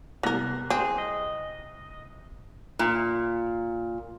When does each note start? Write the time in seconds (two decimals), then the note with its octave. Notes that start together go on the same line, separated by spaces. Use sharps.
0.23 C2 B3 A#4 F#6 A#6
0.70 C4 G#4
0.98 D#5
2.79 A#2